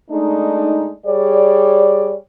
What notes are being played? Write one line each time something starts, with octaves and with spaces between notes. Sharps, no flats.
G#3 A3 D4 D#4
G3 G#4 C#5 D5